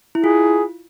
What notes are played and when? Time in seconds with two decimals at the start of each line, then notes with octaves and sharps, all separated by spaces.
0.15 E4
0.24 F4 G#4